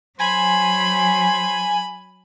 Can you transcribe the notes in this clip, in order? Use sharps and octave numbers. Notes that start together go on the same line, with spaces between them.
F#3 C5 G#5 B5